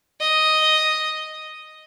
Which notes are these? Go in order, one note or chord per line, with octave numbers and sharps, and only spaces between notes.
D#5